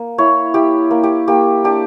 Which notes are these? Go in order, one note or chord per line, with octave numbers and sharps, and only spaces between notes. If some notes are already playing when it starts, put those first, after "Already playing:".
Already playing: A#3
E4 C#5
E4 G4
A#3
G4
A#3 G4
D4 G4